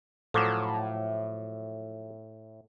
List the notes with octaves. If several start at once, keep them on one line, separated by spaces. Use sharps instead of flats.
A2 F3 F#3 A4 D6 E7